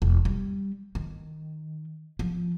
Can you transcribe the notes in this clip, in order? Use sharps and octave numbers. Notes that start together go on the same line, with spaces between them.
E1
G3
D#3
F3